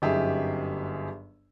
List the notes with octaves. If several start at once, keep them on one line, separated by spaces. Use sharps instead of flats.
G1 F#2 D#4 G4 G#4 E5